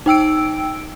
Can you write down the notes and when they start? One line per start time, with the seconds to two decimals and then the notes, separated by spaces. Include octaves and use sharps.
0.06 D#4 G5 E6 D7